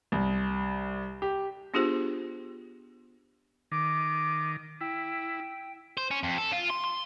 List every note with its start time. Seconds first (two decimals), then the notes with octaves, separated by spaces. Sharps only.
0.12 C2
1.22 G4
1.74 B3 D4 F4 G4 G#4 C5
3.71 D#3 D6
4.81 E4 G5
5.97 C5
6.11 C#4
6.23 F2
6.38 A4
6.52 F4
6.70 C6
6.84 C6